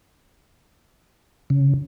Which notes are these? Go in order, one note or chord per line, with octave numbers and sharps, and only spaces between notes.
C#3